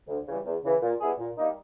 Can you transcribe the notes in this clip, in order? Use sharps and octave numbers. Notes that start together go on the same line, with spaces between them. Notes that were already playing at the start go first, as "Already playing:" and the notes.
D2
C#3 E3 G3
E2
C#3 E3
A#2
G3 B3 E4 G#4
A#2
G3 A#3 D#4